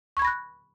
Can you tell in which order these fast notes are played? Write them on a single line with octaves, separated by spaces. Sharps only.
C#6 G#6 B5 A#6 F#6